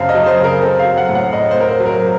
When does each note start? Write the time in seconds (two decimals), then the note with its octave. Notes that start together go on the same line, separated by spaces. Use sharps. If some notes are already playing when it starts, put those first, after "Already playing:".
Already playing: F#2 C#3 C4 F5 A5
0.09 D#5
0.15 F#3
0.26 C5
0.38 C#3
0.44 A#4
0.62 C4 A4
0.79 F5
0.85 F#3
0.98 F#5
1.09 A2
1.15 F#5
1.33 A2 D#5
1.51 C5
1.57 C4 A#4
1.68 C5
1.80 F#3
1.86 A#4